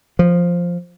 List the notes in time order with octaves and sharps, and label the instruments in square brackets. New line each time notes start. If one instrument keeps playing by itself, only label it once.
[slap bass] F3